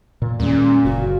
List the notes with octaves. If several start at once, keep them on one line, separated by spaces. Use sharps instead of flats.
A#2
D#2 A#2 G#3 C#4
F#1 F#4